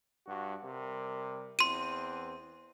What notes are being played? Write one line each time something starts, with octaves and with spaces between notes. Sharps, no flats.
G2 F#4
C3 G3 A#4
E2 E3 C4 C6 D#7